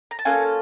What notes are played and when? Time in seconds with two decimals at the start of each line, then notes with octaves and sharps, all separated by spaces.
0.11 A#5
0.19 A5
0.25 A#3 C#4 F4 A4 F#5 G#5